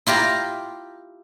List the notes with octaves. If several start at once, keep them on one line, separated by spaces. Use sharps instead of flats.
E4 F4 G4 A#5